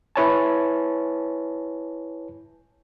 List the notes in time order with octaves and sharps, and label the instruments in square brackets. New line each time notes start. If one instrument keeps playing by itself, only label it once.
[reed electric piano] E4 B4 C#5 G#5 A5